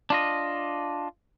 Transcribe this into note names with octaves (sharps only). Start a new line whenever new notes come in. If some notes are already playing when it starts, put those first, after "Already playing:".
D4 F4 D#5